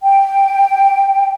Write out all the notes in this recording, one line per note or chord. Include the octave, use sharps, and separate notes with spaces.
G5